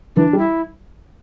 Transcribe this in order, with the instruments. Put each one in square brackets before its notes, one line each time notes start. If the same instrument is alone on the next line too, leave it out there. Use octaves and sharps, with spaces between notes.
[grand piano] E3 [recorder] D4
[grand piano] G3
[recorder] E4